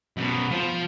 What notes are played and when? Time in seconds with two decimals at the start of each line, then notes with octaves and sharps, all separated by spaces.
0.17 F#2 B2
0.51 F3